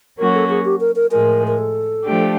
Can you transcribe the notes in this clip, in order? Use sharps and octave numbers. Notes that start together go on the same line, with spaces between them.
F#3 A#3 C#4 F#4 A#4
A4
G#4
G4
A#4
A#4
A2 F3 G#3 A#4
A#4
A4
F3 A3 D4 G4